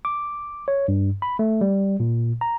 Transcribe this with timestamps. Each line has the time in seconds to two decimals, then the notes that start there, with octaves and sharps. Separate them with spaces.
0.05 D6
0.68 C#5
0.88 G2
1.22 B5
1.39 A3
1.61 G3
2.00 A#2
2.41 A#5